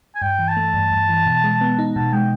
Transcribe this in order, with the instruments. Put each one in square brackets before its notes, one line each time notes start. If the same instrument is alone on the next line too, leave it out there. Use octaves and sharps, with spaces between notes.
[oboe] G#5
[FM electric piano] G2 [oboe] G5
[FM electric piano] E3
[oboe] A5
[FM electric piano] A3
G2
G2
E3
B2
G#3
B3
D#4
[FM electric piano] B2 [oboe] A5
[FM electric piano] G#3 [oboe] G5